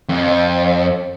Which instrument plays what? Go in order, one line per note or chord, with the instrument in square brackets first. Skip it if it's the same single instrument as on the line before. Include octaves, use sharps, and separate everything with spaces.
[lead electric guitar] F2